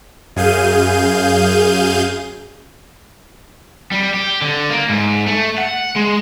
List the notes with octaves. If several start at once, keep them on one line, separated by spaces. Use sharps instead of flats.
F#2 G#4 F5 G6 D#7
G3
G4
D3
A#3
G#2
A3
F#5
G#3